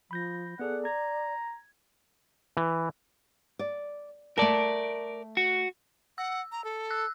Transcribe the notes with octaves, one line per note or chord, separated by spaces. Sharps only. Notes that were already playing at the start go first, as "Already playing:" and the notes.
F3 B5 G6 A#6
B3 G#4 A4 D5 F#5
A#5 G#6
E3
D5
A3 A#4 D5 A5
F#4
F#5 E6
A#5
A4
E6 F#6